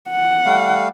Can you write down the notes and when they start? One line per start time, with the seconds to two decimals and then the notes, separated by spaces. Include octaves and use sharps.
0.10 F#5
0.45 G3 A3 F5